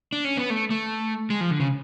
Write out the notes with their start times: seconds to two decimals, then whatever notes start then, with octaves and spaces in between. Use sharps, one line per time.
0.13 D4
0.25 C#4
0.37 B3
0.50 A3
0.70 A3
1.30 G#3
1.41 F3
1.51 D3
1.60 C#3